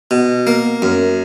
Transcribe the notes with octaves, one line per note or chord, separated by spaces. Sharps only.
B2
A#3
F#2